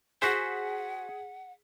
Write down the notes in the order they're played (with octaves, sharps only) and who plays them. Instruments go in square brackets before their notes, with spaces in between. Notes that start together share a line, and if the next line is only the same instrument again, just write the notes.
[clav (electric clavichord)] F#4 C5 [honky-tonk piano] G#4 B6 [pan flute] F#5